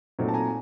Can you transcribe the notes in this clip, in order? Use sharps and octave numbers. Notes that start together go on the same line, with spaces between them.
A#2 F#3 A3 C4 D#4
A5
G#5 A#5